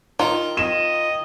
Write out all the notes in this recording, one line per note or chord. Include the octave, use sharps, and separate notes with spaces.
D#3 F4
D#5 E7